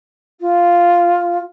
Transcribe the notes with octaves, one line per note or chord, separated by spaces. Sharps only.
F4